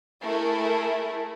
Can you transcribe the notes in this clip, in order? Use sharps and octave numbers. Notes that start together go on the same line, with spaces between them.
A3 E4 G#4 A#4